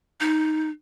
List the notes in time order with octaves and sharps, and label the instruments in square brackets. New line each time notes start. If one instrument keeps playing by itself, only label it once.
[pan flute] D#4